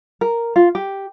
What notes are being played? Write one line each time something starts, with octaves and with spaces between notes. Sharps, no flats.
A#4
F4
G4